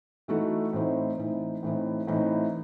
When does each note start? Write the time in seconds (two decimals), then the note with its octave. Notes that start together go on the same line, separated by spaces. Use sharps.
0.28 E3 A3 D#4 F#4 A4
0.73 A2 E3 C4 D#4
1.18 A2 E3 C4 D#4
1.63 A2 E3 C4 D#4
2.07 A2 E3 C4 D#4